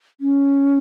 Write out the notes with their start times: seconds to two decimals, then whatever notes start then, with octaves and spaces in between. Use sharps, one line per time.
0.21 C#4